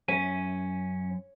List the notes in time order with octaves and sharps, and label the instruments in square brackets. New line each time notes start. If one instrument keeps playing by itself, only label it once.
[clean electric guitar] F#2 E5 G#5 [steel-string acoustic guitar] C#4